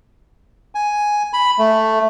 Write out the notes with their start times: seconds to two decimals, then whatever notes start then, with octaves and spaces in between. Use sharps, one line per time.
0.75 G#5
1.33 B5
1.58 A3